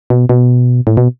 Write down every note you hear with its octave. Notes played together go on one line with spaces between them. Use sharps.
B2
B2
A2
B2